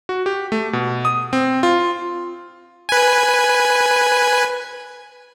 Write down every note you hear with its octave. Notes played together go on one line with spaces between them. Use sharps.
F#4
G4
A3
B2
D#6
C4
F4
B4 G#5